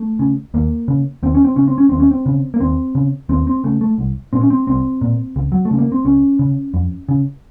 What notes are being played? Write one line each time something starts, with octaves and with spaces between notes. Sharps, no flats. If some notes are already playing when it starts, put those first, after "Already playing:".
Already playing: A3
C#3
D#2 A#3
C#3
D#2 C4
C#4
C4
C#3 C#4
C4
C#4
D#2 C4
C#4
C4
C#3
A#3
D#2 C4
C#3
D#2 C4
C4
C#3 A3
A3
C2
A#2 C4
C#4
C4
C2 C4
A#2
C#2
F#3
A3
C#3
A#3
C4
C#2 C#4
C#3
F2
C#3